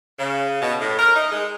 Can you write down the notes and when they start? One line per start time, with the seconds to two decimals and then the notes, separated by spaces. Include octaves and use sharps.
0.19 C#3
0.62 B2
0.81 A2
0.99 A#4
1.16 D#4
1.32 G#3